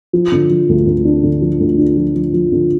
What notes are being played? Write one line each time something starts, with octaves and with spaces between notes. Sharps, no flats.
F3
D3
F3
D2
D2
D4
D3
F3
D2
D4
F3
F3
F3
D3